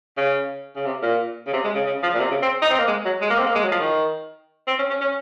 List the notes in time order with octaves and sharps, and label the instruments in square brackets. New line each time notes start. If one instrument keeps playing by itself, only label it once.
[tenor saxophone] C#3
C#3
C3
A#2
C#3
C3
G#3
C#3
C#3
F3
A#2
C3
C#3
C4
D#4
C4
A#3
G#3
F#3
G#3
A#3
C4
A#3
G#3
F#3
F3
D#3
C4
C#4
C#4
C#4